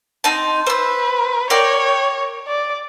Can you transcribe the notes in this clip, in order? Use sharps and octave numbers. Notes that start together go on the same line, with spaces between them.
C4 D#4 A5
B4 C5 E6
A#4 C#5 D5 G5
D5